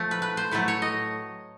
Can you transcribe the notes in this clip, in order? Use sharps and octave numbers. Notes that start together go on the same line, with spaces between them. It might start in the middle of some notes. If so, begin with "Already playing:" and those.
Already playing: F3 A3
B4
B4
C5
A2 F#3 A3 B4
C#5
D#5